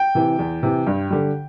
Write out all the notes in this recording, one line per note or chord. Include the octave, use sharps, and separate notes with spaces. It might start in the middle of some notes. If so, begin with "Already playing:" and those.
Already playing: G5
C3 E3
E2
C3 E3
G2
D3 G3